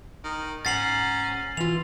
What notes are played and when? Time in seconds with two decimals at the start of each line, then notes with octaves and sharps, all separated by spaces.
0.24 D#3
0.65 G#2 C#4 F#5 A#5 A6 C7 F#7
1.57 E3 F4 F7